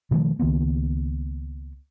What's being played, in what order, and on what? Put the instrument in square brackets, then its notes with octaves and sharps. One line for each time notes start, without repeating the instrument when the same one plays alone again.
[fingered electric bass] B2 D#3 F3 A3
C#2 D#3 A#3 B3